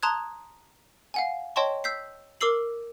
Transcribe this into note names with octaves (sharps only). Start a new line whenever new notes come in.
A5 A#5 C6 D#6 F#6 G#6
F5 F#5 G#5
C#5 D#5 G5 A5 C6 C#6
E6 G6 B6 C7
A#4 D6 E6 C7 F#7